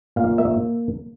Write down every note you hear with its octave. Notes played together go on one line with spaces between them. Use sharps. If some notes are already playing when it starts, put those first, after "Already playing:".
A#2 F5
A#3 E5